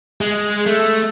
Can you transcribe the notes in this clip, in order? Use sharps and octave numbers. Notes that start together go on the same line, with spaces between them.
G#3
A3